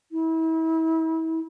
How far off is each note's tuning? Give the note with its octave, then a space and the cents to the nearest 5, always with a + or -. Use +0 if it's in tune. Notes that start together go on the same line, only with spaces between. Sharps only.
E4 -35